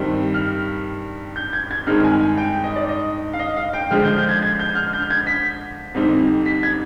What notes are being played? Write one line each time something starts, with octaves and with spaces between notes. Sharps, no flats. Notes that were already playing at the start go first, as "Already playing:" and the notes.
Already playing: G2 D#3 G3 C4
F6
G6
G#6
G#6
G2 D#3 G#3 C4 D#4 F6
G#5
G#5
G5
D#5
D5
D#5
F5
D#5
F5
G5
D3 F3 G#3 D4 F6
G6
G6
G#6
G#6
G6
F6
G6
G#6
B6
F2 D3 G3 C4 D#4
B6
G#6